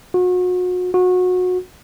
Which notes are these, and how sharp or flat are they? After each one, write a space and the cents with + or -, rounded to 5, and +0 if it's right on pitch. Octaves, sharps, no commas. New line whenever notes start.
F#4 -35
F#4 -25